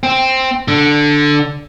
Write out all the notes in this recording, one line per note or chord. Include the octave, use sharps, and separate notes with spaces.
C4
D3